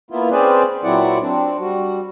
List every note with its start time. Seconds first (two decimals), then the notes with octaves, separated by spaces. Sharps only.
0.11 A#3 B3 E4 F4
0.31 C4 C#4 G#4 B4 C5 D5
0.84 A#2 F#3 C4 E4 D5 F#5
1.21 C4 D4
1.60 G3 F#4